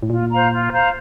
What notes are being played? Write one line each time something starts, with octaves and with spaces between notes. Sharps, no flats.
A2
A#2 F4
C5 F5 A#5
F4
C5 F5 A#5